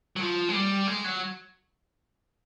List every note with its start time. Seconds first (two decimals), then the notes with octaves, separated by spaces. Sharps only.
0.16 F#3
0.21 F3
0.49 G#3
0.54 G3
0.87 G#3
1.04 F#3